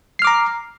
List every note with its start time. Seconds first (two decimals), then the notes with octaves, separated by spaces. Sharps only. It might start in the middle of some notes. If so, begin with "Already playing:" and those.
0.19 C7
0.22 F6
0.25 D6
0.27 A#5